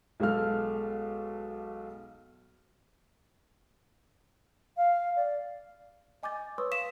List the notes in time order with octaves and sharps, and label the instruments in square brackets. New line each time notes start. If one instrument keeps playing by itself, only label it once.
[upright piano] B1 G#3 A4 F5 F6
[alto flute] F5
D5
[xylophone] D#5 G#5 D6 G6 A6
B4 C#5 C6 C#6 D#6 E6
F5 B6 E7